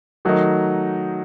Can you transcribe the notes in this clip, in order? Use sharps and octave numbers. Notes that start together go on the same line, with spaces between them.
D#3 F#3 A3 D#4